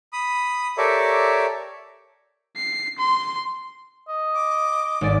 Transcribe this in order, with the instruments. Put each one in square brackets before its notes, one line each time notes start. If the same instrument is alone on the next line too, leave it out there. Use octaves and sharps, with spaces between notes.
[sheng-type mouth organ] B5 D#6
G4 A4 A#4 C#5 D5 E5
[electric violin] C7
C6
[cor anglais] D#5
[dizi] D6
[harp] G#1 D5